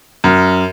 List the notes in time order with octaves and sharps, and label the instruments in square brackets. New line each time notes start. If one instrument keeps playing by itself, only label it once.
[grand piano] F#2